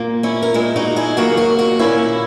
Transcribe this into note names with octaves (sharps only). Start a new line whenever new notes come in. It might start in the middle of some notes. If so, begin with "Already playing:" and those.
Already playing: A#2 A#3
C#4 E4
A#4
A#2 G#3 E4 G#4
D#4 F#4
E4 G#4
D#2 C#3 F#3 A#3 F#4 A#4
F#4 A#4
F#4 A#4
A#2 A#3 C#4 E4